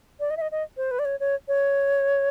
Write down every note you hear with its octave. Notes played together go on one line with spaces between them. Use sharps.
D5
D#5
E5
D#5
D#5
C5
B4
D5
C#5
C#5
C#5